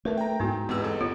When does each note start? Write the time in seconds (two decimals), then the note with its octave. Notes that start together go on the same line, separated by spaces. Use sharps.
0.05 A3 A#4 B4 A5
0.18 G5 A#5
0.40 G#2 B3 E4 F#4
0.69 E2 G#3 B3 C4 G4 B4 E6
0.84 G1 A4
1.01 G1 B3 F4 C#5